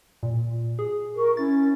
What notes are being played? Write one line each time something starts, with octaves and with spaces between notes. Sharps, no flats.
A#2
G#4
A#4 C#6
C#4 E4 A6